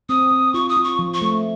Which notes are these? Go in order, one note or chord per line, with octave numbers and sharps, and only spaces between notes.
C4 D#6
C4
F4 C#6
D#6
F4
C#6
F3
C#6
A3